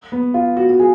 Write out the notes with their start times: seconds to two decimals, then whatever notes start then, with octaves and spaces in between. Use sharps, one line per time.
0.12 B3
0.34 F4
0.57 F#4
0.69 F#4
0.80 G#4